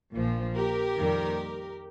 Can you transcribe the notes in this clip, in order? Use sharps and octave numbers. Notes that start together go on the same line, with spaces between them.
A#1 A#2 F3
G4 A#4
F2 D#3 G3 A#3